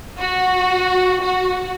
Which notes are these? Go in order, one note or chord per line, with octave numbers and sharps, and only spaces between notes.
F#4
F#4